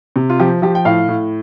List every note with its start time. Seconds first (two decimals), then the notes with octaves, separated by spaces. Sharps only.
0.16 C3
0.30 F4
0.40 F3 G4
0.62 F3 G4
0.75 G5
0.85 A2 F5
1.09 A2